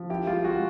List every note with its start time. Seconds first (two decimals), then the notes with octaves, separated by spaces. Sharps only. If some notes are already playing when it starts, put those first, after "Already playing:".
Already playing: F3
0.10 E4 G4
0.27 G#3 F4
0.44 G#3 F#4